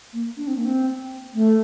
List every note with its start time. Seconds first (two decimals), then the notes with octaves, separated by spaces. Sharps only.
0.13 A#3
0.37 D4
0.47 C4
0.56 A#3
0.65 C4
1.34 A3